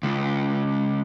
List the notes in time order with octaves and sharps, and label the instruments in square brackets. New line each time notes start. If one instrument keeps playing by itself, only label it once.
[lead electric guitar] C#2